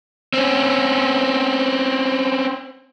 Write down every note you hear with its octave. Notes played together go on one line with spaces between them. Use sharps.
C4 C#4